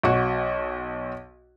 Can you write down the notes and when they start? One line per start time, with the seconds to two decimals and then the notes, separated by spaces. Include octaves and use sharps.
0.03 B1 F#4